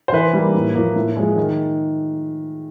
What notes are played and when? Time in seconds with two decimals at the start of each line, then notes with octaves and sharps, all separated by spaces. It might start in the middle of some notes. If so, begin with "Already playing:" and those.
0.08 C5
0.12 E3 B4
0.33 G3 A#3
0.54 A2
0.75 F3 A#3
0.96 A2
1.16 F3 G#3
1.37 D#3